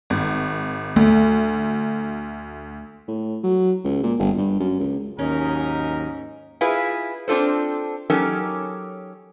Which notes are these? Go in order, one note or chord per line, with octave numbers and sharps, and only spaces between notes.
G#1
D2 A3
A2
F#3
C#2
A#2
G1
G2
F#2
C#2
D#2 G#2 F#3 C#4 D#4 A#4
E4 F4 G#4 B4
C4 D4 F4 A4 C5
F#3 C#4 D#4 G4 A4 A#4